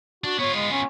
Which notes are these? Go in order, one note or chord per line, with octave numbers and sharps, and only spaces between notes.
D4 F#4
B3 F4 C#5
G#3
C#4